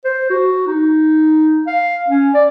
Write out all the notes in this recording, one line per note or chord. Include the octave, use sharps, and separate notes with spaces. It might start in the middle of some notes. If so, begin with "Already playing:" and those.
C5
F#4
D#4
F5
C#4
D5